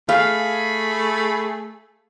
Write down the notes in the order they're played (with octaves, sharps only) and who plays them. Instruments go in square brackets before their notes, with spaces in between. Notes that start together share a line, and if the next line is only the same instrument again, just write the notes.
[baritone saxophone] A3 [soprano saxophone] G#4 [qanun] F5 [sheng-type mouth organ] B5